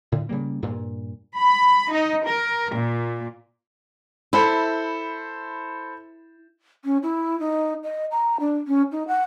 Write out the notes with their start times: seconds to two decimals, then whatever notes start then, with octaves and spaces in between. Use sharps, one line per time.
0.12 A2 D3
0.29 C#3 G3 A#3
0.62 G2 A#2
1.38 B5
1.92 D#4
2.26 A#4
2.73 A#2
4.33 E4 A4 C5 B5
6.85 C#4
7.03 E4
7.40 D#4
7.84 D#5
8.11 A#5
8.40 D4
8.67 C#4
8.92 D#4
9.08 F#5